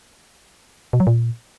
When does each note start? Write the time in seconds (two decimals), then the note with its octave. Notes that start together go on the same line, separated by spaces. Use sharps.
0.93 B2
1.00 F#3
1.07 A#2